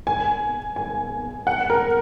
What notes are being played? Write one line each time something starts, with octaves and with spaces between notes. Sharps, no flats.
G#5
G#5
F#5
A#4